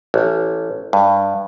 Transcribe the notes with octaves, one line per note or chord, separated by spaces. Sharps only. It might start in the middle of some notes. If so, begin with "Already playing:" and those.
A1
G2